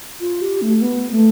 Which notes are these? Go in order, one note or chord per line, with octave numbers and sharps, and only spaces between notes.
F4
G4
A3
B3
A3